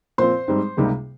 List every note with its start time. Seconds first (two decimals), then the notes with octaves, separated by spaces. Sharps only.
0.18 A#2 F3 C4 C5 C6
0.48 G#2 G3 C4 D#4
0.77 C#2 C3 G3 A#3 D#4